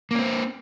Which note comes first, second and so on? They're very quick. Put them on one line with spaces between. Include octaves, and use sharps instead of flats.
A#3 C#4 C4